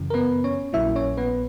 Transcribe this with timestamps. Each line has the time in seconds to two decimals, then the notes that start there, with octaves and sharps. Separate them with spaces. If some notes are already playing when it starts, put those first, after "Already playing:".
Already playing: F#2 C#3 E3
0.10 A#4
0.14 B3 B4
0.44 C#4 C#5
0.73 A#1 A#2 F#3 A#3 C#4 E4 E5
0.96 C#4 C#5
1.17 B3 B4